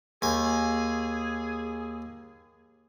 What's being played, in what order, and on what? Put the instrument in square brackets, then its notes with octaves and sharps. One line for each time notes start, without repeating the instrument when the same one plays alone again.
[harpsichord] D#2 G#5 [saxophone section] G#4